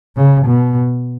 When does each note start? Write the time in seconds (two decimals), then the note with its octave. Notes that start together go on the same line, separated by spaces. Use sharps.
0.16 C#3
0.46 B2